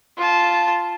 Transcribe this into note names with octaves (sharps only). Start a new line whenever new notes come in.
F4 A5